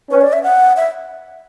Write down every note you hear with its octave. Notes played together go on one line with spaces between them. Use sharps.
C#4 B4
D5
E5
F#5
E5